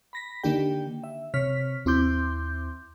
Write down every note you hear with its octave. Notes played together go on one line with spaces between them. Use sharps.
B5 A#6 B6
D3 D#3 A#3 D4 G4 G5
E5
C3 C#5 F6 B6
D#2 C4 E4 C6 D6 G6